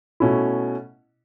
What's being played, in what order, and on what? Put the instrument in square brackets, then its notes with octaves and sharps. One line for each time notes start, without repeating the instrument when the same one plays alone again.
[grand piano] B2 A3 C#4 E4